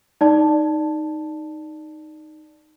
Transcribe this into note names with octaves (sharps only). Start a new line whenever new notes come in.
D#4 D5 A5